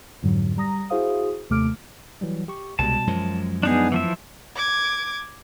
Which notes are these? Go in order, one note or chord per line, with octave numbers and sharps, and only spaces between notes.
F2 G#2 D3 F#3
G3 A#5 D#6 A#6
E4 F#4 G#4 C5 F5 D#6
D#2 C3 A3 D6 F6 D7
E3 F#3 G3
G4 C#6
C2 B2 G3 G#3 A5
F#2 F3 G#3
B3 D4 D#4 G#4
E3 F3 E5
D6 G#6